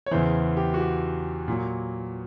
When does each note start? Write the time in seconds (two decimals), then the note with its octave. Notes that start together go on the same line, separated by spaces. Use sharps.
0.06 C#5
0.11 E2 C#3 E3 C5
0.57 G4
0.74 F#4
0.80 G4
1.48 A#2 F#3